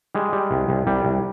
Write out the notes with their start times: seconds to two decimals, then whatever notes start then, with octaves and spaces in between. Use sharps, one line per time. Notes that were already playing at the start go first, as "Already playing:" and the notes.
0.15 G3 G#3
0.33 G3
0.51 C2
0.69 C2
0.87 C2 G3
1.05 C2